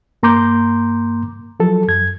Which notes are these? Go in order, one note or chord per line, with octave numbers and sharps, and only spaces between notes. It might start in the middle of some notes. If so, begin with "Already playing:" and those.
G2 A#3 A#5 C6 D6 G6
F3 F#3 A4
F#2 G#6